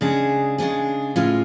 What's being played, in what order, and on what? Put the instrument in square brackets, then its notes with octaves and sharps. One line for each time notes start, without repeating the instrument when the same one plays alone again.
[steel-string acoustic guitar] C#3 G#3 D4 G#4
C#3 G#3 D4 G#4
A2 G#3 C#4 F4